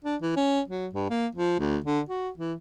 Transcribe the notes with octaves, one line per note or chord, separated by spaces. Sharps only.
D4
E3
C#4
F#3
G2
A#3
F3
D2
D3
F#4
E3